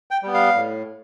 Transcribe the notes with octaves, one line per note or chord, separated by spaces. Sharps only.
G5
G3 B3
F5
A2